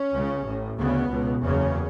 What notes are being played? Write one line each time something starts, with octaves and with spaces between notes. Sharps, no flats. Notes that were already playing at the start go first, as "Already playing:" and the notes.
Already playing: C#4
C#2 C#3
A1 A2
D2 C#3 B3
C#2 B2
F#1 E2 C#3 C#4